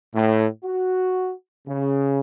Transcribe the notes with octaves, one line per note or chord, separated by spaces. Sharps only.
A2
F#4
C#3